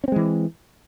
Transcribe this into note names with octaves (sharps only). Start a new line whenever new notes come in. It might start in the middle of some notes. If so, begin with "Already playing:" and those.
E3 G#3 C4 C#4